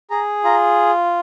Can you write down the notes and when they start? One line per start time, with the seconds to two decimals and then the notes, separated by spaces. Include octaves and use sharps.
0.10 G#4 A#5
0.44 F4 A#5